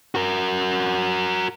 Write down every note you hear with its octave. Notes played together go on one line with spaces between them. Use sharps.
F#4 A#4